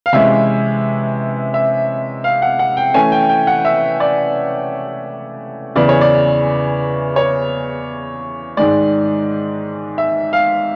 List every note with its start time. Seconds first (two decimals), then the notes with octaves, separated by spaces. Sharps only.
0.06 F5
0.13 C3 E3 G#3 C#4 E4 E5
1.54 E5
2.24 F5
2.42 F#5
2.59 F#5
2.77 G5
2.94 E3 A3 C#4 G#5
3.12 G5
3.29 G5
3.47 F#5
3.65 E5
4.00 D5
5.76 E2 C#3 E3 D5
5.89 C#5
6.01 D5
7.16 C#5
8.57 G#2 D#3 G#3 D5
9.98 E5
10.33 F5